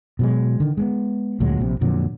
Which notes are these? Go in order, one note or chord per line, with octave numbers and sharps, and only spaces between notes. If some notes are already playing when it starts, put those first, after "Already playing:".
B2 F#3 G#3
D3 D#3
G#3 A#3 B3
D2 A#2 F#3 G#3
A#1 C3
F2 A#2 D3 F#3